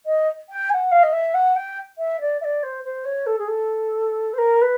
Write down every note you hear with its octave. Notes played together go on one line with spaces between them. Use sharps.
D#5
G5
G#5
F#5
F5
D#5
E5
F#5
G5
E5
D5
E5
D5
C5
C5
C#5
A4
G#4
A4
C5
A#4
B4